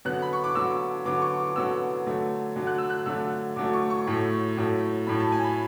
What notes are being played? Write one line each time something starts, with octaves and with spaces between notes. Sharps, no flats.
D3 F#3 B3 F#6
B5
C#6
D6
D3 F#3 B3 E6
D3 F#3 B3 D6
C#6
D6
D3 F#3 B3 E6
D3 F#3 A3
D3 F#3 A3
F#6
E6
F#6
D3 F#3 A3 E6
D3 F#3 A3 D6
C#6
C#6
A2 F#3 A3
A2 F#3 A3
A2 F#3 A3 B5
A5
G#5
B5